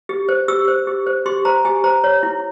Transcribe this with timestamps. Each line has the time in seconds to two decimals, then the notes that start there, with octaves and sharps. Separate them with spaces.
0.09 G4
0.29 C5
0.48 G4 E6
0.68 C5
0.87 G4
1.07 C5
1.26 G4 C6
1.45 C5 A#5
1.65 G4 G#5
1.84 C5 A#5
2.04 C#5
2.23 E4